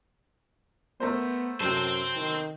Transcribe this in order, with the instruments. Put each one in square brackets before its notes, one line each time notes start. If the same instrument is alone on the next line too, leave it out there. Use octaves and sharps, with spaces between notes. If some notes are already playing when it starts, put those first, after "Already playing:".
[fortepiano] A3 A#4 C5 [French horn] B3
[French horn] F#2 [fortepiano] C3 F#3 A4 [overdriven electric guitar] C4 C5
[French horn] D#3